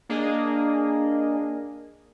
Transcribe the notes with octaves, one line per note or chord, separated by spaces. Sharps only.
A#3 D4 G#4 D#5